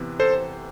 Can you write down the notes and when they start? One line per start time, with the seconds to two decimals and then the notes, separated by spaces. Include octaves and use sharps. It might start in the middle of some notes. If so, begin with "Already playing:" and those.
Already playing: C3 E3 B3
0.20 A4 C5